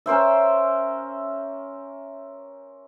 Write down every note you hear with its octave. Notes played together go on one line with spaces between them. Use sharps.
C#4 A#4 C5 E5